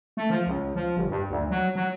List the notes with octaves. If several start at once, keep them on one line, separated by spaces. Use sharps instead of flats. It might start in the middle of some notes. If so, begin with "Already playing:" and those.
A3
F3
C#2
F3
G1
G2
D2
F#3
F#3